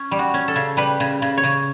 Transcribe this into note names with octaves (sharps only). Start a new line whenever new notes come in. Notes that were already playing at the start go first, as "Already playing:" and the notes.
Already playing: C#4
G3
F#4
C#4
A4
C#3
G3 B4
C#3
C#3
C#5
C#3